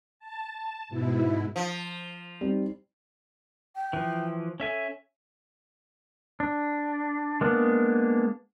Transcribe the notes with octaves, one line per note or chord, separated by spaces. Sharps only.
A5
G#2 B2 E4
F3
G3 C4 D#4
G5
E3 F3
C#4 A4 E5 G#5
D4
G#3 A#3 B3 D4